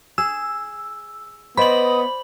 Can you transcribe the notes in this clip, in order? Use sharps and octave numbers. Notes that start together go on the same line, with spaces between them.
G#4 E6
B3 C5 D5 D#5 B5 F#7